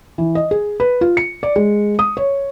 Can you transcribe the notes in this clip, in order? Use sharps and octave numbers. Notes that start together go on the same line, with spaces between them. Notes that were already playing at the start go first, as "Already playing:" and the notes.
E3
D#5
G#4
B4
F4
C#7
D5
G#3
D#6
C#5